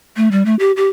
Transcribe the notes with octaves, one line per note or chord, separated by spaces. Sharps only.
A3
G3
A3
G4
G4